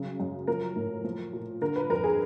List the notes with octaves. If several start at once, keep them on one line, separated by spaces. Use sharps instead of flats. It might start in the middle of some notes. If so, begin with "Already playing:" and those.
Already playing: F#2 C#3
F#2
F3 A#4
A2
F3
A#2
D3 A#4
B4
F2 A#4
G#4